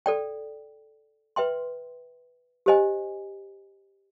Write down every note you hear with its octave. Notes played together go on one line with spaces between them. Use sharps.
A4 D5 G5
B4 E5 G5 C6
G4 C5 D#5 G#5